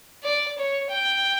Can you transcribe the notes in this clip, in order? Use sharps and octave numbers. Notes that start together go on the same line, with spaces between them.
D5
C#5
G5